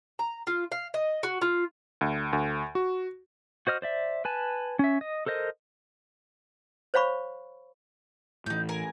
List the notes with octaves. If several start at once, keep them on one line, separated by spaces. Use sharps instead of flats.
A#5
F4
F5
D#5
F#4
F4
D2
D2
F#4
F#4 C5 D#5 F6
C5 D5 E5
B4 G#5 A5
C#4 E5
D#5
A4 A#4 C5 D#5
C5 C#5 F5 B5 C#6
A2 E3 D#4 G6
A#4 G#5